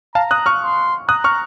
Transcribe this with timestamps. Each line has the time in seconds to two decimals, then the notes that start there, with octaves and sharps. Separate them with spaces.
0.15 F5 A5 A#5
0.31 D#6 F#6
0.46 C#6 F6
0.62 C6
1.08 A#5 D#6 F#6
1.24 C#6 F6